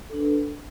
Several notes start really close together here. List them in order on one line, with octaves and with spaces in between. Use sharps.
A4 D4 B4